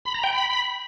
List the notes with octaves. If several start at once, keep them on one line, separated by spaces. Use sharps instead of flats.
B5
A#5
G5
B5